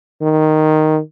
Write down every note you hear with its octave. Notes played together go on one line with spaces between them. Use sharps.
D#3